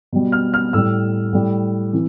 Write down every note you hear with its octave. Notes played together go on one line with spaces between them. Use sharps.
B2 G3
F6
F6
A2 G3 E6
A2 G3
C3 E3